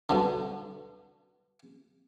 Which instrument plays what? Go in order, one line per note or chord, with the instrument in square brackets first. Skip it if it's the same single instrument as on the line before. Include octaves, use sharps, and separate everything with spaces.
[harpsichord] G2 B2 D3